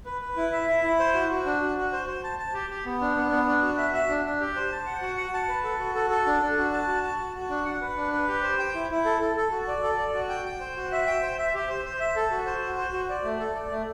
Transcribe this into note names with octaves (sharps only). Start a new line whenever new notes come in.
B4
B4
E4
E5
E4
E4
C5
F#4
F#4
D4
F#4
F#4
C5
C5
A5
A5
G4
G4
B3
D4
B3
B3
D4
F#4
E5
E5
D4
D4
G4
C5
A5
F#5
F#4
F#5
A5
B4
A4
F#4
A4
A4
D4
D4
F#4
A5
F#4
A5
F#4
F#4
D4
F#5
B4
D4
B4
G4
C5
G5
E4
E4
A4
A4
A4
F#4
D5
A4
D5
F#4
G5
G5
C5
F#4
E5
G5
C5
E5
G4
C5
C5
E5
A4
F#4
C5
F#4
C5
F#4
D5
A3
A4
D5
A3